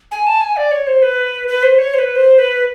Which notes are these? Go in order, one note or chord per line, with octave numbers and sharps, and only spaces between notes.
G#5
A5
G#5
D5
C#5
C5
B4
B4
C5
C#5
C5
B4
C5
B4